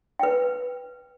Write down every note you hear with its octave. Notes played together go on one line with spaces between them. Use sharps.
B4 G5